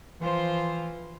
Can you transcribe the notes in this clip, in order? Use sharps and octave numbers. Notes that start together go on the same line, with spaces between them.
E3 F3 F4 C5